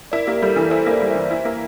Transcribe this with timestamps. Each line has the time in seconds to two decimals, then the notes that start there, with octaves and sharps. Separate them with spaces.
0.12 E4 A#4 D5
0.27 A#3 G4 A#4
0.42 G3 A4
0.56 E3 A4
0.71 E4 A4 C5
0.86 A#3 A#4 D5
1.02 G3
1.10 E3 C5 E5
1.31 E4
1.45 A#3